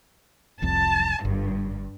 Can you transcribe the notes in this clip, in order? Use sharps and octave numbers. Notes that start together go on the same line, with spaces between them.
F1 C2 F2 A5
G1 G2